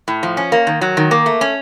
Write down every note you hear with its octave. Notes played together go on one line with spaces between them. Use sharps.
A2
F3
C#4
A#3
D#3
F#3
D#3
A#3
A3
C#4